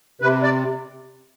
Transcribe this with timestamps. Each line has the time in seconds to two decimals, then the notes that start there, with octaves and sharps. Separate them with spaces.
0.22 C3 B4
0.43 D5